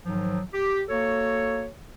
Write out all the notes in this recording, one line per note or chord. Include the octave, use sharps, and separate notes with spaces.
G#2 D#3 F3 F#3
G4
A#3 F#4 A4 C#5